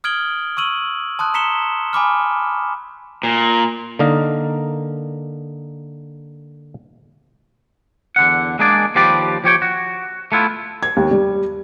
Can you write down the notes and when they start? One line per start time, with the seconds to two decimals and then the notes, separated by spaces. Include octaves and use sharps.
0.04 D#6 F6 G#6 D7 F#7 G7
0.57 C#6 E6 D#7 F#7
1.19 A5 C6 D#6 F#6
1.34 A#5 B6 C#7 E7 G7
1.93 G#5 B5 D6 F6
3.23 A#2
3.99 D3 A#3 D#4 A#4
8.16 E2 D3 F#5
8.59 G#3 A#3 D4 G#4 D5
8.95 D#2 F3 G4 B4 D5
9.44 F3 G4 C#5 G5
9.62 F#4
10.32 A3 B3 E4 F4
10.83 G#6
10.97 D#2
11.11 G3